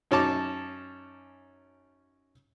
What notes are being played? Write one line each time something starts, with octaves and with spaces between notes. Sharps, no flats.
F#2 C#4 D#4 A5 D6